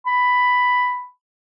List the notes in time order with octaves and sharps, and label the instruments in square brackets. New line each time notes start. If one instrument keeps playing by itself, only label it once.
[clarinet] B5